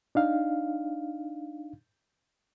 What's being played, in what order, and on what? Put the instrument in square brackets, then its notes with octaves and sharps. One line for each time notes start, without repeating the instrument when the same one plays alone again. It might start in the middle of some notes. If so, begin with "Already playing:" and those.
[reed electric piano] D4 D#4 F5